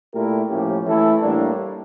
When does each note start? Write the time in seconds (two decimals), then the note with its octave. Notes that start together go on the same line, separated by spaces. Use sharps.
0.14 A#2 A3 E4 G4 A#4
0.49 A2 F3 A#3 C#4 G4
0.85 E3 A3 E4 A4
1.21 A2 G3 A#3 D4